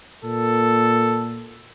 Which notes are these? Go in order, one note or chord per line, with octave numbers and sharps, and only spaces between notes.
A#2 A4